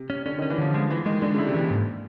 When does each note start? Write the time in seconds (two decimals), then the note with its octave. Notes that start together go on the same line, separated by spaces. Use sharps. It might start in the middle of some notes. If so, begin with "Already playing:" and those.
Already playing: C3
0.10 C#4
0.25 D3 C#4
0.39 D#3 C#4
0.50 E3
0.58 D3 F3
0.74 F3 G#3
0.90 E3 G#3
1.06 D#3 G#3
1.22 D3 G#3
1.34 C#3 E4
1.47 C3
1.54 A#2 E3
1.70 G#2